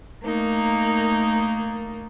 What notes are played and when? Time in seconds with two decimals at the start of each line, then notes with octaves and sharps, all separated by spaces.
0.23 A3 A#3 D#4